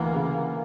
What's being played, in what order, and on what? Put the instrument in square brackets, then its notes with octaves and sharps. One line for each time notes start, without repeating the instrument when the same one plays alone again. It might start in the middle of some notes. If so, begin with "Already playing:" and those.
Already playing: [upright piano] D2 E3 [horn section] A#3
[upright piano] C#3